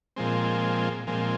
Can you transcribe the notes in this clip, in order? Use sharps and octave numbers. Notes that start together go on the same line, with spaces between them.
A#2 F3 G#3 C4
A#2 F3 G#3 C4